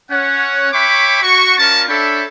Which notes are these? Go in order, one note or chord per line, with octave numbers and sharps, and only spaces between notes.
C#4 C#5 F#5
C#5 E5 G5 B5 C#6 D6
F#4 C#6
C#4 F4 A#4 D5 A5
D4 A4 C#5 E5 G5 B5